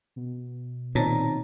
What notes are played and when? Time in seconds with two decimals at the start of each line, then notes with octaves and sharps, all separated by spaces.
0.16 B2
0.95 A#2 D#3 C4 D#4 C#5 A5 A#5